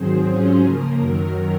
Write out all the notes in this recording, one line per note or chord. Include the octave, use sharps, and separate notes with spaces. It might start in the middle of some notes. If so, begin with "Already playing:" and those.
Already playing: G#2 D#3 F#3 C4 G#4 C5
G#2 F#3 C#4 F4
C#3 F3 A#3 A#4
F#2 D#3 F#3